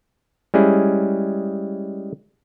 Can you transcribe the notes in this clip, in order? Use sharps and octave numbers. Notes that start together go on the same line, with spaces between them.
G3 G#3 C#4 E4 G#4